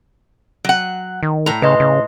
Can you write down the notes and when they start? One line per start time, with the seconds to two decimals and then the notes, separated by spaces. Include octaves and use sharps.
0.65 F#3 F#5
1.23 D#3
1.46 A2 A#5
1.62 C#3 B4 D#5 C6
1.80 C#3